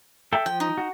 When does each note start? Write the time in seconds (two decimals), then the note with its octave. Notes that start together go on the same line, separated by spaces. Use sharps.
0.33 A4 E5 G5
0.46 F3 G5
0.60 D#4
0.78 F#4